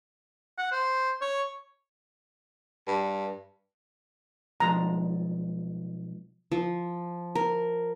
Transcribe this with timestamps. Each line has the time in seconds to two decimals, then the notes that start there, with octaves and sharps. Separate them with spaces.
0.58 F#5
0.72 C5
1.21 C#5
2.87 G2
4.60 B1 F3 G#3 A#5
6.52 F3
7.35 A#4